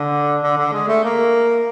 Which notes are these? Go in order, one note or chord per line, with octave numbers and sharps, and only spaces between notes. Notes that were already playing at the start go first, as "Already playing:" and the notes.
Already playing: D3
D3
D3
G#3
A3
A#3